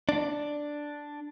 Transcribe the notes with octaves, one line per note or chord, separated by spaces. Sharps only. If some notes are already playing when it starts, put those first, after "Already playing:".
D4